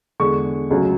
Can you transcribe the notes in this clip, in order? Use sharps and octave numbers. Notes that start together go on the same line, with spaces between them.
E2 D3 G#3 C#6
C#2 C#3 F#3 A3